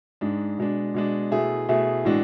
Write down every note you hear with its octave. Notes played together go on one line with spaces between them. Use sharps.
G#2 G#3 D4
B2 G#3 D4
B2 G#3 D4
B2 A3 E4 G#4
B2 A3 E4 G#4
A2 E3 G#3 D4 F#4